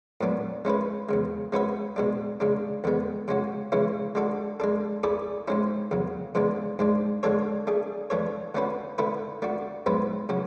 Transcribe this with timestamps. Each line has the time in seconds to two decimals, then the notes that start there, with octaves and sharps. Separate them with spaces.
0.21 A2 F#3 B3 D4
0.65 G#3 C#4 E4 B4
1.09 E2 C#3 G#3
1.52 G#3 C#4 F#4 B4 E5
1.96 B2 G#3 D4
2.40 C#3 G#3 D4
2.84 E2 D3 G#3 B3
3.28 C#3 G#3 C#4 F#4
3.72 C#3 E3 G#3 C#4 E4
4.15 G#3 D4 F#4 A4
4.60 G#3 D4 A4
5.03 A3 E4 G#4 D5
5.48 G#2 G#3 C#4 E4
5.91 E2 C#3 F#3
6.35 C#3 E3 G#3 B3 D4
6.79 G#2 G#3 D4
7.23 D3 G#3 D4 A4 C#5
7.67 A3 D4 G#4
8.10 E3 A3 D4 A4 C#5
8.55 D3 A3 C#4 F#4 B4
8.98 D3 A3 E4 B4
9.42 A3 D4 F#4
9.86 G#2 F#3 B3 E4 B4
10.29 C#3 F#3 C#4